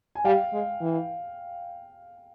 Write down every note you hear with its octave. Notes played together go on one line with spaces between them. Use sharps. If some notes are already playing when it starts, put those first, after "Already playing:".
G#5
G3 F5 G5
G#3
E3